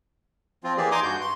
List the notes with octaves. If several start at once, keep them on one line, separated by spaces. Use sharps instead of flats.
F3 C4 F4
E3 A#3 G4 G#4 D5
D#4 G#5 A#5 C6 D6 D#6
G2 F#4 G6
C6